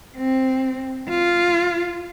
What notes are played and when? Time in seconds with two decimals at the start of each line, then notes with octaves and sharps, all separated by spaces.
0.17 C4
1.09 F4